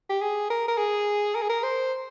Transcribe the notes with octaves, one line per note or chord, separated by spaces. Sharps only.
G4
G#4
A#4
A#4
G#4
A#4
G#4
A#4
C5